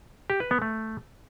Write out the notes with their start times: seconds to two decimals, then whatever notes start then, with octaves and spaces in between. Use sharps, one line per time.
0.30 G4
0.40 B4
0.51 B3
0.62 A3